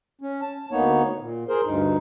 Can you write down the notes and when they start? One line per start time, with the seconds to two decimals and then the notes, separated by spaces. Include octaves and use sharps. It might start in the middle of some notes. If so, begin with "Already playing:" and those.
0.21 C#4
0.42 A5
0.71 D2 A#3 B3 D#4 C#5
1.20 A#2
1.49 G#4 A#4 C5
1.65 D2 G2 D#4